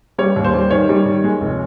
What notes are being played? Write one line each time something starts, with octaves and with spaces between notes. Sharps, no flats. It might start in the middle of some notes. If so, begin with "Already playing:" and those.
G3 C#5
D#2
C5
G3
D#3 C#5
G3
D#3
G#3
F1